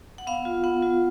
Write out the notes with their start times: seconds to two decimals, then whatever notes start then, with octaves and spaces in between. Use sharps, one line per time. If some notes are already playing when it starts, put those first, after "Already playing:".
0.18 F#5
0.27 B3 F5
0.45 F4
0.64 B3 F#5
0.82 F4